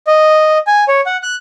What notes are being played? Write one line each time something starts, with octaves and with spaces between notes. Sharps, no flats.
D#5
G#5
C#5
F#5
F#6